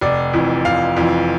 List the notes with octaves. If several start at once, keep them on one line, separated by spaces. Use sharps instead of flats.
F1 D5
F2 E3
F1 F5
F2 E3